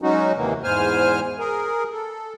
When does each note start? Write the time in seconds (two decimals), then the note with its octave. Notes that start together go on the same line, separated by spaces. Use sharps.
0.02 F#3 G#3 C#4 D#4 F#4
0.36 D#2 C3 E3 A#3
0.64 E2 G#2 C5 G#5 F6
1.39 G#4 A#4
1.92 A4